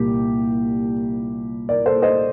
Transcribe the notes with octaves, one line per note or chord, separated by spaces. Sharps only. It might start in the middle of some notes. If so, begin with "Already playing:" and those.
Already playing: C2 A#2 G3 A#3 G4
A#4 D5
A4 C5
C5 D#5